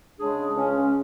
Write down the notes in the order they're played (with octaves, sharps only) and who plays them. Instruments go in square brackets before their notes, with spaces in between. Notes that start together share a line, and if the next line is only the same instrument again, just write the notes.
[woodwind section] C#3 G#3 D4 G#4
C#2 C#3 G#3 C#4